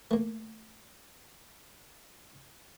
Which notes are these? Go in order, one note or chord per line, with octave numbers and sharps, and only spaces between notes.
A3 A#3